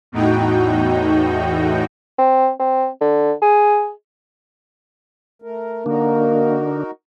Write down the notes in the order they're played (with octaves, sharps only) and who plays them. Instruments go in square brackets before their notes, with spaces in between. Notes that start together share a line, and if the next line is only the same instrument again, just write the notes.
[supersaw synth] E2 A2 D#4 F#4 G5
[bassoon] C4
C4
D3
G#4
[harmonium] A3 A#4
[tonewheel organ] D3 D4 [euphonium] A#3 [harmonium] D#4 F#4 A#4